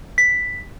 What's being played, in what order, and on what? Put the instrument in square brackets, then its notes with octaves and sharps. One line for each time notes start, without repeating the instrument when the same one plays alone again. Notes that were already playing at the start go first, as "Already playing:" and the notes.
[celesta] B6